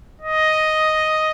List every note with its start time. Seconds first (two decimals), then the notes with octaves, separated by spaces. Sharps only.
0.21 D#5